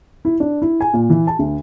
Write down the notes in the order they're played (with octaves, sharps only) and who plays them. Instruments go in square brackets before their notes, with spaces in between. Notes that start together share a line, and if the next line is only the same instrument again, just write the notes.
[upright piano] E4
D4
E4
G#5
A#2
E3
A5
D2